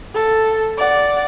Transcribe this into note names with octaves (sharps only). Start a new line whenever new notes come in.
A4
D5 F#5